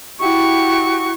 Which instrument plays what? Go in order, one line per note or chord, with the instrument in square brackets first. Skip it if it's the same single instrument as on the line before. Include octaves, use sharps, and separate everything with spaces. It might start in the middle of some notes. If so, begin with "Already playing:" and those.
[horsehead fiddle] E4 [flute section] F#4 G4 [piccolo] C#6